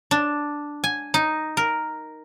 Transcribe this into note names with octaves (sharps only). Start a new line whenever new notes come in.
D4
G#5
D#4
A#4